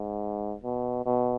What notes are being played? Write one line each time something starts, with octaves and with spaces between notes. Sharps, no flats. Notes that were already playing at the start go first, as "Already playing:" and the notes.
Already playing: G#2
B2
B2